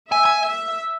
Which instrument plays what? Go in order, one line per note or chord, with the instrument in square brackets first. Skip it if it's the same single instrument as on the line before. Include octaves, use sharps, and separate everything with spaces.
[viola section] E5 [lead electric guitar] G#5
[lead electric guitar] G#5
[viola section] E5